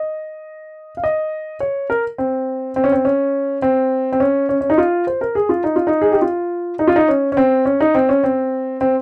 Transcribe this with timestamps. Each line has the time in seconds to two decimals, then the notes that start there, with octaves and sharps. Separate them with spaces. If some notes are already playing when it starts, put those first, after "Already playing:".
Already playing: D#5
0.97 F5
1.04 D#5
1.60 C#5
1.90 A#4
2.18 C4
2.76 C4
2.84 C#4
2.92 C4
3.05 C#4
3.62 C4
4.12 C4
4.20 C#4
4.49 C#4
4.61 C#4
4.70 D#4
4.78 F4
5.07 C5
5.21 A#4
5.35 G#4
5.49 F4
5.64 D#4
5.76 F4
5.87 D#4
6.02 G#4
6.12 G4
6.22 F4
6.79 D#4
6.88 F4
6.96 D#4
7.08 C#4
7.32 C#4
7.37 C4
7.65 C#4
7.81 D#4
7.95 C4
8.09 C#4
8.24 C4
8.81 C4